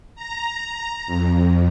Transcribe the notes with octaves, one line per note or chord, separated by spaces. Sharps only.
A#5
F2